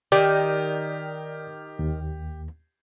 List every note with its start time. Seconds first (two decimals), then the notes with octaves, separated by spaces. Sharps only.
0.12 D#3 G4 D5
1.79 D#2